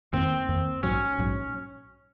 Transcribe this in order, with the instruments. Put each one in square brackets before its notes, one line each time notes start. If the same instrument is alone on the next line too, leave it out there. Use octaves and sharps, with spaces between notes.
[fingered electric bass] F2 D#3 A#3 [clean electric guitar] C4
[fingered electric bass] F2 D#3 A#3
[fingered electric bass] A#1 G#2 F#3 [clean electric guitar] C#4
[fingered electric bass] A#1 G#2 F#3